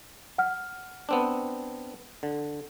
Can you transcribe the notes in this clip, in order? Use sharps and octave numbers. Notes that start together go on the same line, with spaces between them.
F#5 F6
B3 C4 D4
D3